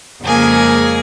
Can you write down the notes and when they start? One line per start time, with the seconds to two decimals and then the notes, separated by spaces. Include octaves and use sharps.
0.23 F2 C#3 G#3 A#3 G#4 G#5